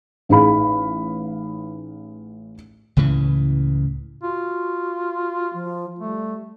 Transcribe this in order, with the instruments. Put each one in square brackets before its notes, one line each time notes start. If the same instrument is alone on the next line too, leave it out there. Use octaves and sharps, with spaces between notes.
[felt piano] A1 D#4 G#4 F5 B5
[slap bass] C#2 A2 C#3 E3
[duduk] F4 [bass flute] F#4
[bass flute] F3
[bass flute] G3 [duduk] A3